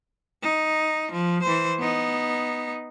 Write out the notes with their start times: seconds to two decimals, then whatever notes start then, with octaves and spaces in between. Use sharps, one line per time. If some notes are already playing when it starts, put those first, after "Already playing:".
0.42 D#4
1.12 F3
1.43 E3 C5
1.79 B3 D#4